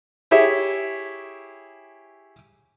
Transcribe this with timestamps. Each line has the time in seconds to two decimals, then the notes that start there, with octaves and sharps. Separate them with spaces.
0.31 E4 G4 G#4 C#5 E5